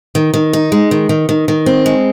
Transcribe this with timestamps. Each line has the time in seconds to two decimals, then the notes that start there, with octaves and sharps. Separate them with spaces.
0.15 D#3
0.34 D#3
0.53 D#4
0.72 G#3
0.91 D#3
1.09 D#3
1.29 D#3
1.48 D#3
1.66 C4
1.86 G#3